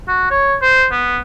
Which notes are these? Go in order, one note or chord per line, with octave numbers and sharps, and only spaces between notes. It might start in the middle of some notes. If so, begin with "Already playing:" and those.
F#4
C#5
C5
B3